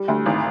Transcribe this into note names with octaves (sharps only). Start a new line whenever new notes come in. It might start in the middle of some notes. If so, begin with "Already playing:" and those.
Already playing: G3
D2
G#1